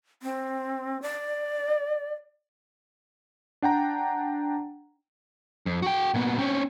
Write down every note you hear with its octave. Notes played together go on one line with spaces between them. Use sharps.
C4
D5
D4 F#5 G5 A#5
F2
F#4 G5
A#2 B3
C4 C#4